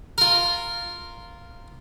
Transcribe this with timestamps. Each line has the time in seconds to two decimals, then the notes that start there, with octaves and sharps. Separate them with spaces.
0.18 F4 A#4